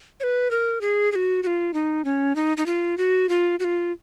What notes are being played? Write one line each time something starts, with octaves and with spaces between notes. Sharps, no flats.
C#5
B4
A#4
G#4
G#4
F#4
F#4
F4
D#4
C#4
D#4
D#4
F4
F#4
F4
F#4
F4